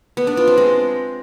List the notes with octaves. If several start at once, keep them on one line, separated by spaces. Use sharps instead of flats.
B3
D4
F4
C4
G#3